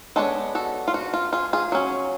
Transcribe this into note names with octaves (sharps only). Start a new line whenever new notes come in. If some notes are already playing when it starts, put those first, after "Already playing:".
G#3 B3 D4 A4 C#5
F#4 A4
F4
F#4
F4
F4 G#4
F4 G#4
F#3 C#4